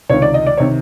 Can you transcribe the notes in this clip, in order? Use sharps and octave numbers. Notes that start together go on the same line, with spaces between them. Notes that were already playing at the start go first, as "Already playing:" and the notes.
C#2 C3 D#3 C#5
D5
D#5
D5
C3 D#3 C#5